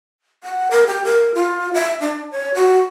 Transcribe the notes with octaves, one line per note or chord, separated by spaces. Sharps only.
F#5
A#4
G4
A#4
F4
E5
D4
C#5
F#4